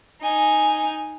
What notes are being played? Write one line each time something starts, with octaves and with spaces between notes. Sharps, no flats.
D#4 G#5